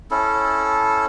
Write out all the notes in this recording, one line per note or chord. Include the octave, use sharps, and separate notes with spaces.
C#4 E4 A4